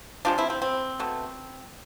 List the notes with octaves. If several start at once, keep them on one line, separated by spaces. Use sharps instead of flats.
C3 F3 G#3 D4 F4
C4 E4
C4
C4
B2 A3